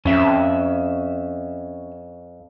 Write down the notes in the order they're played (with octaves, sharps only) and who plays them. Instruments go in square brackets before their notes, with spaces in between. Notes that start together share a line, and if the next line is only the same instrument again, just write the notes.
[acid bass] F2 [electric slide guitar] C#4 E5